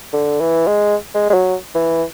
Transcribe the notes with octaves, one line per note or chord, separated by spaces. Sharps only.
D3
E3
G#3
G#3
G#3
F#3
E3